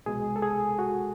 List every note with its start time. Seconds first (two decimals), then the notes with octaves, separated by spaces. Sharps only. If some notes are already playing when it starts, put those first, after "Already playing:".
0.06 C2 B2 G#3 G#4
0.36 A4
0.42 G#4
0.79 F#4